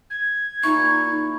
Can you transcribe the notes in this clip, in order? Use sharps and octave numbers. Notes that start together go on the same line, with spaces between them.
G#6
A#2 D#4 E4 C#6